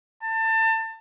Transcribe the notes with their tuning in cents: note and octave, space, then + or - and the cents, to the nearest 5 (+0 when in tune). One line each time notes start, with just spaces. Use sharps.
A5 +30